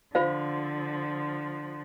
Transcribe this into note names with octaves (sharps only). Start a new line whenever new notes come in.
D3 F3 F4 C5 F5